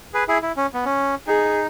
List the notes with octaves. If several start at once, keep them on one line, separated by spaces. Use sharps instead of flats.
G#4 B4
E4 G#4
E4
C#4
B3
C#4
D#4 G#4